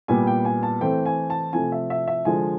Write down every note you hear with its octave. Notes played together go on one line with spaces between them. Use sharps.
A#2 G3 B3 G#5
G5
G#5
A5
E3 A3 C4 G5
G#5
A5
C3 F3 A3 G#5
E5
E5
E5
D3 F3 G#3 G#5